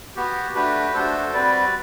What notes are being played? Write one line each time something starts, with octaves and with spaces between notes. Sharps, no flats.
B3 F#4 G4
A3 D4 F#4 G4 B4
A3 D4 F#4 A4 C5
G3 C4 F#4 B4 D5